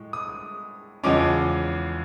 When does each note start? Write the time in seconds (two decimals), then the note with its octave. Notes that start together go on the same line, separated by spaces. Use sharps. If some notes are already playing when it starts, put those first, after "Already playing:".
Already playing: A2 G#3
0.13 D#6
1.03 E2 C#3 F3 G#3 C#4 D6